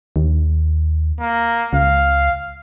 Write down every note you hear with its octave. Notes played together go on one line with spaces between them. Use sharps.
D#2
A#3
C#2 F5